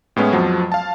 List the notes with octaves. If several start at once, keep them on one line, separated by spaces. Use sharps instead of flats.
A2 G#3 B3 C#4 E4
F2 F3 F#3
F5 A5